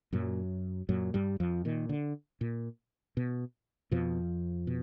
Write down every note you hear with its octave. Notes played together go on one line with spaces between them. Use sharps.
F#2 A#2 F#3
F#2 A#2 F#3
G2 G3
F2 F3
A#2 D#3
D3
A#2
B2
F2 B2 F3
B2